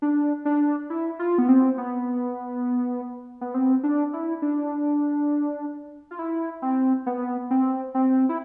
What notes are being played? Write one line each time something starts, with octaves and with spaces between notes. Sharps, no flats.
D4
D4
E4
F4
B3
C4
B3
B3
C4
D4
E4
D4
F4
E4
C4
B3
C4
C4
E4